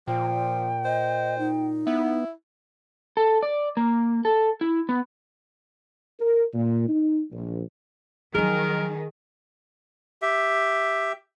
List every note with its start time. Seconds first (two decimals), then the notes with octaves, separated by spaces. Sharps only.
0.08 A#2 F3 G5
0.85 C5 D#5
1.39 D#4
1.87 B3 E4
3.17 A4
3.43 D5
3.77 A#3
4.25 A4
4.61 E4
4.89 B3
6.20 A#4
6.54 A#2
6.89 D#4
7.32 A#1
8.35 D#3 F3 F#3 G#4 A#4
10.22 G4 E5